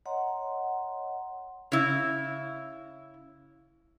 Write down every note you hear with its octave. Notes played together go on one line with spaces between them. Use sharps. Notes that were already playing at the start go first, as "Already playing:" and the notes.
C#5 D#5 F#5 A#5 C6
C#3 E4